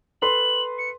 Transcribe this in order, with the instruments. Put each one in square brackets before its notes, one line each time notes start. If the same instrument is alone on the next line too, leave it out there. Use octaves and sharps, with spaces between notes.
[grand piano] A4 B4 C6 [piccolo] F#7
[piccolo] C#7